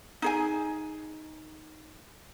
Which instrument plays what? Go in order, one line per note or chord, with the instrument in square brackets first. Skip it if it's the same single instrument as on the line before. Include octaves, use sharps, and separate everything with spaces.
[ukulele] D#4 G#4 G#5